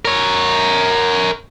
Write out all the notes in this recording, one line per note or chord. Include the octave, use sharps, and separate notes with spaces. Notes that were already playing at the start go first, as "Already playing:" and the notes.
A#4 C#5